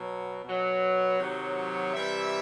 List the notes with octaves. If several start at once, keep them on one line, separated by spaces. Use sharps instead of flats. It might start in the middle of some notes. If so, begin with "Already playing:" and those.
Already playing: B2 F#3
B2 F#3
C3 D#3 F#3
C3 E3 G3 E5